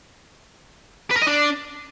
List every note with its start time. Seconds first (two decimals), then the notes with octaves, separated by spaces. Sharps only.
1.11 B4
1.16 A#4
1.22 D#5
1.27 D4